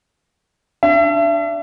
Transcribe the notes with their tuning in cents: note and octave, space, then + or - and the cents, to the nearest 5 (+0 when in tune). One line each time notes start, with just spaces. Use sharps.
D4 +0 E5 +35